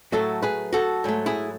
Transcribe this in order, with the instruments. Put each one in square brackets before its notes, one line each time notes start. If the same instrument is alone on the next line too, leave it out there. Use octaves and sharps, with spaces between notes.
[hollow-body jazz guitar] A2 F#3 A3 F#4 A4
G#4 B4
F#4 A4
G#2 F#3 A3
E4 G#4